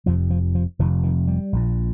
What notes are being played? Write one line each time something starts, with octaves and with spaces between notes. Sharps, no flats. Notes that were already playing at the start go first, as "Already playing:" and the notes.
F1 F2 C3 F3
F3
F3
F1 F2 C3 D#3
D#3
G3
A#1 A#2